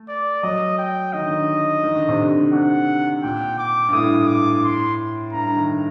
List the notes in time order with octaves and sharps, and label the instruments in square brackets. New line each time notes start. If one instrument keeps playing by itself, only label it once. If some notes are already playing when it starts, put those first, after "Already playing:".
Already playing: [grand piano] A3
[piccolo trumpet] D5
[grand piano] F#3 [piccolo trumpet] D#5
[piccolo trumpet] G5
[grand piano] D#3 [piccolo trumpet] D#5
[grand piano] D3
D#3
D#3
D3
C3
D3
D3
[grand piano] C3 [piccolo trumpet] F#5
[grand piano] A#2 [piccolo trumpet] G5
[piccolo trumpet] D6
[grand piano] G2
[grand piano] A2 [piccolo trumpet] D#6
[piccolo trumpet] D6
C6
[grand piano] G2 [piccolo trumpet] A#5
[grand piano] D#3